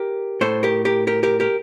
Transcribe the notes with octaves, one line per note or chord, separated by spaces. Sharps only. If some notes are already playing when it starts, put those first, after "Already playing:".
Already playing: G4 A#4
A2 A4 C5
G4 A#4
G4 A#4
G4 A#4
G4 A#4
G4 A#4